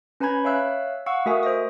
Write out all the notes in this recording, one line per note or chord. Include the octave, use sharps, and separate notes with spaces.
C#4 B4 G#5 A#5 B5 G#6
C#5 E5 F5 E6 F#6
F5 F#5 C#6 E6
A3 F#4 A#4 E5 G#5 D#6
C5 D#5 D#6